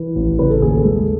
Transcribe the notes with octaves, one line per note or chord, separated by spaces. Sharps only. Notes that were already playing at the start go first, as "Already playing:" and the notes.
Already playing: E3 B4
A1
C#3 B4
A4
D#2 G#4
A4
G#3